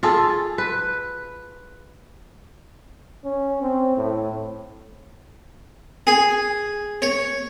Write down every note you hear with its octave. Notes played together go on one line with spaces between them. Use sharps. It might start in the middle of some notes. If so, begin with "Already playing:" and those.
F4 G#4 A4
B4
C#4
C4
A2
G#4
C#5